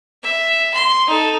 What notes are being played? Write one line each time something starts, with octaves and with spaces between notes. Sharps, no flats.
E5
C6
D#4 A4